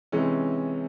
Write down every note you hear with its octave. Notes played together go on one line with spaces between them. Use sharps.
C3 E3 G#3 C#4